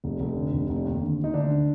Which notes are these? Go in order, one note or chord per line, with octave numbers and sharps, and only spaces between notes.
F1
F1
D3
F1
F1
D#2
D3
D#2
D#4
D2 D3 D4
D3